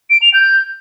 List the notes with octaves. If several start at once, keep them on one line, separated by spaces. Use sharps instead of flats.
D7
F7
G6